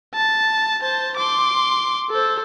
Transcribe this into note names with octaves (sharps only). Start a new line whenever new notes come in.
A5
C5 A5
C6 D6
A4 C5